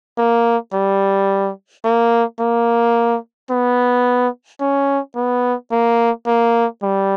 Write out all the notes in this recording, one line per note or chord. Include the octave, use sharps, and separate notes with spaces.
A#3
G3
A#3
A#3
B3
C#4
B3
A#3
A#3
G3